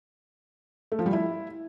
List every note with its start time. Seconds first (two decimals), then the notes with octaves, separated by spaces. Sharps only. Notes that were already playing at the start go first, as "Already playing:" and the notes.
0.92 A3
0.99 F3
1.06 G3
1.13 E4